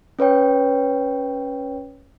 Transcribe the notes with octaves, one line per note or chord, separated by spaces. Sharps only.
C#4 B4 C#5 G5